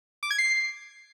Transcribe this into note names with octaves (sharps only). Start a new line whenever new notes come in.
D6
G#6
C7